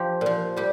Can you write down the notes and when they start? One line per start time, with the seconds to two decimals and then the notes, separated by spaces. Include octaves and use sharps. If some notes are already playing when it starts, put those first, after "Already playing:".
Already playing: F3 G4
0.21 A#2 F3
0.56 A#2 G3 G4